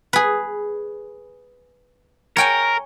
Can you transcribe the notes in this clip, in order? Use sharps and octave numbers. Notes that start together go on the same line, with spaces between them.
G#4 B4
A#4 C#5 G5 G#5